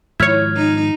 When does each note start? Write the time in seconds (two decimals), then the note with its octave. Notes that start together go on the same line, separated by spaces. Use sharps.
0.20 G#2 D#3 F3 E4 C#5 F6 G#6
0.56 D#4